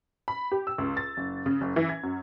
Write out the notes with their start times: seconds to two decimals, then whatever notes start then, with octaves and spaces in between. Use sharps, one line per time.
0.28 B5
0.52 G4
0.67 E6
0.78 C#2
0.97 A6
1.17 F#1
1.46 C#3
1.61 F#1
1.76 E3
1.89 G#6
2.03 F#2